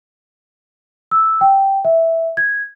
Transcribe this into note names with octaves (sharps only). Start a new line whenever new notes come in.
E6
G5
E5
G#6